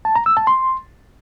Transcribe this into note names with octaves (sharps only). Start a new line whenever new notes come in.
A5
A#5
E6
A5
C6